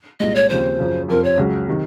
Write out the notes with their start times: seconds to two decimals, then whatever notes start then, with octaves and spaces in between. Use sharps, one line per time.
0.20 C2 A#2 G#3 D#5
0.35 C#5
0.49 D#2 C#3 F3 C4 C5
0.79 F#2 C#3 F3
1.08 F2 C3 F3 C4 A#4
1.24 C#5
1.38 C#2 C#3 F#3
1.68 C3 D#3